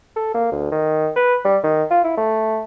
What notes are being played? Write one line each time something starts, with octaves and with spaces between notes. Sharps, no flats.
A4
A#3
D2
D#3
B4
G3
D#3
F4
E4
A3